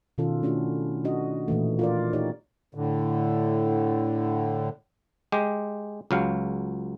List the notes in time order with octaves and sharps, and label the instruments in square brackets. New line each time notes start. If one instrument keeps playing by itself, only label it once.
[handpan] B2 D#3 C#4 F4 A4
A3 C#4 D4 E4 F#4
C#4 D4 F#4 D#5
A#2 E3 A3
F4 A#4 D5
D#4 F4 G4 C#5 D5
[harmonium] A2 D3
[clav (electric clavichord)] G#3 G4
C#2 F#3 F5